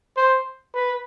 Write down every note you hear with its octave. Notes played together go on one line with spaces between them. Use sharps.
C5
B4